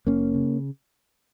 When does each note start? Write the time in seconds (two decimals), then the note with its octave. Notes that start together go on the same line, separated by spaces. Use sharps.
0.07 F#1 A#3 C#4
0.34 C#3